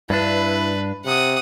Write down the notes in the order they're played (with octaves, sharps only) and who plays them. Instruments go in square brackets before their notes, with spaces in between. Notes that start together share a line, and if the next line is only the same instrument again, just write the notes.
[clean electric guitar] G2 D4 [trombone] E4 [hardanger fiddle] B4
[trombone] C3 [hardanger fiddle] F#5 D#6